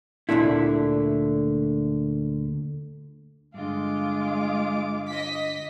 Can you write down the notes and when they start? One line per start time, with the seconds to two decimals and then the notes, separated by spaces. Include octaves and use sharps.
0.29 D2 A#2 D3 A3 E4
3.54 G2 D3 G#3 F4 D6
5.08 D#5 B6